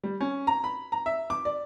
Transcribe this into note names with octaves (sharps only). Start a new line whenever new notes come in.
G3
C#4
A#5
B5
A#5
E5
D6
D5